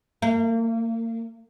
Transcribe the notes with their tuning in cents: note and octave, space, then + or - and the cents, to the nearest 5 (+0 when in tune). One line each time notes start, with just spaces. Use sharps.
A#3 -35